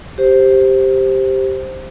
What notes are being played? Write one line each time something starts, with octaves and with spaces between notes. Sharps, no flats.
G4 C5